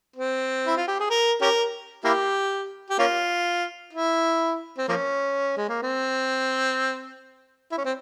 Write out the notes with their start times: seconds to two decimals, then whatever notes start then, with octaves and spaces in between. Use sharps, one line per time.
0.16 C4
0.67 E4
0.77 F4
0.88 G4
1.00 G#4
1.10 A#4
1.41 C#4 G4 A#4
2.05 A#3 E4 G4
2.90 G4
2.99 A#3 C#4 F4
3.93 E4
4.78 C4
4.88 F3 A#3 C#4
5.57 G#3
5.69 A#3
5.82 C4
7.71 E4
7.77 C#4
7.85 C4